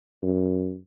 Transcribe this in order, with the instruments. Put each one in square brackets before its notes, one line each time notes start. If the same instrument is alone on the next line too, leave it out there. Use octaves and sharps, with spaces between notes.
[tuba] F#2